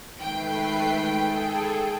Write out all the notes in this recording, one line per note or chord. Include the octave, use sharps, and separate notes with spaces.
D#3 G#3 A3 B4 G5 C7
G#4 A4